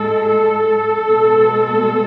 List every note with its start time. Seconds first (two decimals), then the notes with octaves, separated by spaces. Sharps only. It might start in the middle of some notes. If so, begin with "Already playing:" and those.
Already playing: A2 G#3 A4
0.29 A4
1.06 B2 G#3